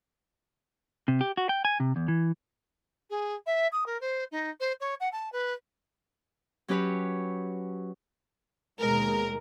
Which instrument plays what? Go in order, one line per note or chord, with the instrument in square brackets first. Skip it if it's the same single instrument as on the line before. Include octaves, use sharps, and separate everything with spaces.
[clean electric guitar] C3
G4
F#4
G5
G#5
C3
E2
E3
[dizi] G#4
E5
D#6
A#4
C5
D#4
C5
C#5
F#5
A5
B4
[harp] F#3 C#4 G4 B4 C#5
[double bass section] D#2 B2 G#3 [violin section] A#4